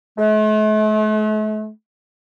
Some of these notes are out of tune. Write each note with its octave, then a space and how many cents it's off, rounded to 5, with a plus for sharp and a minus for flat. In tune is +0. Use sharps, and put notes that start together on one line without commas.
A3 -45